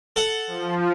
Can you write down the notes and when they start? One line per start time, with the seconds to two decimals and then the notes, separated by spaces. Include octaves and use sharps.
0.16 A4 F#5
0.47 F3